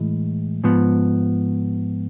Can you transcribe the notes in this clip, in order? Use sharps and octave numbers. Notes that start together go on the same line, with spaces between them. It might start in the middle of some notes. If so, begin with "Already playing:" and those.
Already playing: A2 E3 G#3
G#2 F3 B3